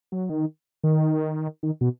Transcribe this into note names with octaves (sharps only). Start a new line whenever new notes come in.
F#3
D#3
D#3
D#3
B2